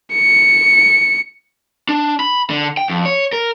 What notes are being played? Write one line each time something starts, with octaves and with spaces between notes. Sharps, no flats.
C#7
D4
B5
D3
G5
F2
C#5
A#4